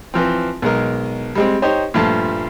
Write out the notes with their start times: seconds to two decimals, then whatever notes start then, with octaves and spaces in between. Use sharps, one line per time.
0.14 E3 F3 C4
0.62 B1 G#3 A#4
1.35 G3 G#3 C4
1.62 D#4 G4 C5 C#5
1.94 G2 A#2 F3 A3 A5